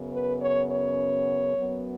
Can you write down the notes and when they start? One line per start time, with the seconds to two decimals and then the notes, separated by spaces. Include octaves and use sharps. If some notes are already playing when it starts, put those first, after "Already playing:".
Already playing: F#2 C#3 B3
0.12 B4
0.41 C#5
0.70 C#5
1.57 F#2 F#3 B3